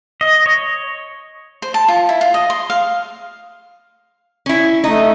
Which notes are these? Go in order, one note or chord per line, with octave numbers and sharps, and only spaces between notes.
D#5
C#5
C5
A5
F4
E4
F4
D#5
C6
F5
C#4 E4
A3 D#4